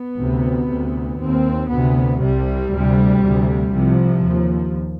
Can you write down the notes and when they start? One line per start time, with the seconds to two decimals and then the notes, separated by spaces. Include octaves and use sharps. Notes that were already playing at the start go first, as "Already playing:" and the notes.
Already playing: B3
0.18 D2 C3
0.69 D2 C3
1.20 D#2 C4
1.70 D2 C3 B3
2.21 C2 C3 G3
2.72 D2 C3
3.22 D2 C3
3.73 C2 C3 F3
4.24 D#2